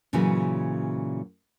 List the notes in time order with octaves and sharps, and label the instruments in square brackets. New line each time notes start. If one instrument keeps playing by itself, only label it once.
[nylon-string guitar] A#2 C#3 E3 F#3 F#4 B4